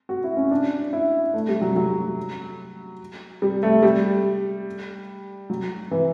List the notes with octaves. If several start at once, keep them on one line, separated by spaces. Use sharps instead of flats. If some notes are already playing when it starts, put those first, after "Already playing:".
F#4
E4
C#4
D4
E4
A3
G3
F#3
F#3
G3
A3
G3
F#3
E3